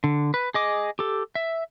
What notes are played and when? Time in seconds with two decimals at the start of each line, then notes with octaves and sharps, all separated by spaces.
0.04 D3
0.34 B4
0.54 G#4 D#5 D6
0.99 G4 A4
1.35 E5